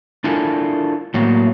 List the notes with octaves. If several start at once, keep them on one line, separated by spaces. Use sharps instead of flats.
D4 E4 F4 A4 A#4 G#5
A2 F#3 A#3 B3